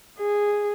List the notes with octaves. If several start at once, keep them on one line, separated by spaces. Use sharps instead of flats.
G#4